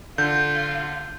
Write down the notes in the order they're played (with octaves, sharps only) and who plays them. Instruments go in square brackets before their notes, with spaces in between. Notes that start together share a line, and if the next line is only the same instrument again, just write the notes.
[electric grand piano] D3 [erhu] F4 [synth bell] G6